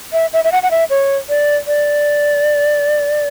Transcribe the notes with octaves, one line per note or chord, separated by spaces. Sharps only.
E5
E5
E5
F#5
F#5
E5
C#5
D5
D5